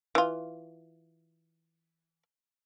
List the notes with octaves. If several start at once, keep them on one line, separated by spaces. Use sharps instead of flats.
E3 F4